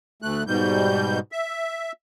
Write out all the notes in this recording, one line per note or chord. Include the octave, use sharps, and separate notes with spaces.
D2 A3 F#6
G#2 B2 G3 G6
E5